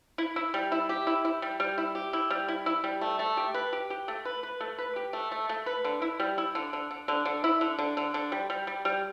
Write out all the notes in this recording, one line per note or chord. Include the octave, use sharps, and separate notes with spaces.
E4
E4
G3
E4
G4
E4
E4
G3
G3
E4
G4
E4
G3
E4
E4
G3
A3
A3
G4
B4
G4
G4
A3
B4
B4
A3
B4
G4
A3
A3
A3
B4
D3
E4
G3
E4
D3
D3
D3
D3
D3
E4
D3
D3
D3
D3
G3
G3
G3
G3